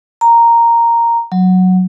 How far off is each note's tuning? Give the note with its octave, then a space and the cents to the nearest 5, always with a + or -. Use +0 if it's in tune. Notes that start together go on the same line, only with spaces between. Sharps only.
A#5 -5
F#3 -5